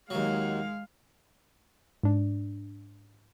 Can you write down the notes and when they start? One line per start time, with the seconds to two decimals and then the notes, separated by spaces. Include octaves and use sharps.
0.10 D#2 F#3 G#3 F5
2.03 G#2 D4